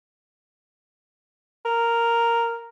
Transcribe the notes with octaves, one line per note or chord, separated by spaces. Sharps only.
A#4